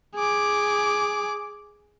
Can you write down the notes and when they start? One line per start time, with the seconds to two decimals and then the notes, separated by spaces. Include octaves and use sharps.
0.15 G#4 D6